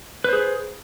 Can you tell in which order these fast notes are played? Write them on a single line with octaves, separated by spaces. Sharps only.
B4 C5 G#4